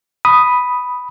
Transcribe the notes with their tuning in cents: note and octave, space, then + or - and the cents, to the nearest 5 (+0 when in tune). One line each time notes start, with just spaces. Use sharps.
B5 +0 D#6 +0